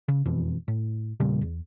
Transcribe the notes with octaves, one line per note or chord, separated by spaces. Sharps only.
C#3
E1 F2 B2 E3
A2
E2 A#2 C#3 G3
E2